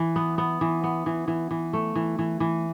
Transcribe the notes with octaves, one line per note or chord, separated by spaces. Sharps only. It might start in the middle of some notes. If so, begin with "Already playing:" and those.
Already playing: E3
B3
B3
E3
B3
E3
E3
E3
A3
E3
E3
E3